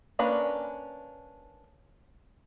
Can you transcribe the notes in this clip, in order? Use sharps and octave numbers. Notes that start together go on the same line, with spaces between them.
A#3 C#4 D4 B4 A#5